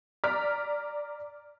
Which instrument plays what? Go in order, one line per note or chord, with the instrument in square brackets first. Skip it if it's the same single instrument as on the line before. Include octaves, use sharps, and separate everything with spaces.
[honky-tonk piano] D5 A#5 F6 B6